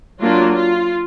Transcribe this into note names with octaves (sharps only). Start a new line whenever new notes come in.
F#3 A#3 D4 F4
F4